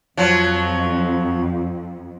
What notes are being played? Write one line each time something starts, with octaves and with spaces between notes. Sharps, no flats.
F2 F3 F#3